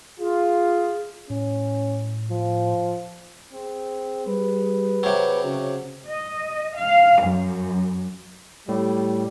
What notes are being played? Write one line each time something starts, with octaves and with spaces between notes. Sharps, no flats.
F4 G#4
A2 C#4
F3
C4 G#4
G3 B4
C3 F#3
C#3 F#4
D#5
F5
F#2
A2 G3